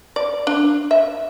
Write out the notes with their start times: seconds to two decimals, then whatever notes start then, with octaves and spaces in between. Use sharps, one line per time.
0.16 D5
0.47 D4
0.91 E5